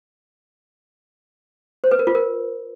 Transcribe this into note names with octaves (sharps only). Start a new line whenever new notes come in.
C5
B4
A#4
F4
A#4